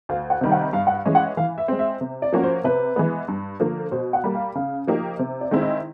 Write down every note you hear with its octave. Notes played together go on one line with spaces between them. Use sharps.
D2 F5
F#5
C3 D#3 G3
F#5
G2 F5
F#5
F5
E3 G#3 C#4
F#5
E3 F5
E5
G#3 C4
E5
C3
D5
F3 A#3 C#4 F#4
C5
C3 B4
E3 G#3 B3
G2
D3 F3 A#3
B2 C5
F#5
G3 A#3
F5
C#3 F5
F3 A#3 D#4 G4
C3
D5
D#3 G#3 C4 E4
D#5